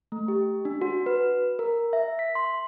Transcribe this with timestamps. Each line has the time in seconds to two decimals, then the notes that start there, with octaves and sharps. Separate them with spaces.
0.12 A3
0.28 G4
0.65 D4
0.81 F#4
1.06 B4
1.59 A#4
1.93 E5
2.19 B6
2.35 C6